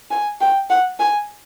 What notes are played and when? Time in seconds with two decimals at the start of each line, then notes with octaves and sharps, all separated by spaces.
0.11 G#5
0.41 G5
0.70 F#5
1.00 G#5